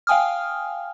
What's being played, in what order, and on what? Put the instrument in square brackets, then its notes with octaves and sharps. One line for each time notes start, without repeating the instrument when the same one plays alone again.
[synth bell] F5 G5 G#5 D#6 F6